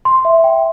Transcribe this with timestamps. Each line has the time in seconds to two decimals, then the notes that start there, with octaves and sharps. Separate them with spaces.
0.05 C6
0.25 E5
0.44 G5